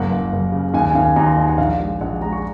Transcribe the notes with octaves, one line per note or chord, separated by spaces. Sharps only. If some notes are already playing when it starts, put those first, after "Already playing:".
Already playing: F#1 A#3 F#5
F#1
F#1
C#3
D#2 G#5
G#5
D#2 F5
G#5
D#2 A#5
C6
D#2
F#5
A#1 F5
G#3
A#1 F#5
G#3 A#5
C#6